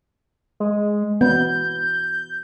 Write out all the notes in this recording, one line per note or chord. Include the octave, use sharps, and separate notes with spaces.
G#3
B3 G6